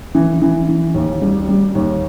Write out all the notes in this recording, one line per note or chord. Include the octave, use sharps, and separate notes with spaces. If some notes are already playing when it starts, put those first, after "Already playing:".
E3
E3
E3
D#2
G3
G3
D#2